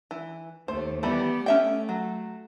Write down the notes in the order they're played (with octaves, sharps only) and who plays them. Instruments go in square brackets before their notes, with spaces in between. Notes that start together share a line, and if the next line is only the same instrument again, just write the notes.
[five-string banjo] E3
[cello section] D#2 A3 [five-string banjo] C5
[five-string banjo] E3 G3 B5 [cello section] B3 G4
[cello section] A3 [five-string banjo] C#4 E5 G5
[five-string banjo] F#3